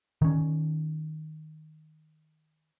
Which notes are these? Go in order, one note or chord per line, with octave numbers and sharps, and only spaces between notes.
D#3 C#4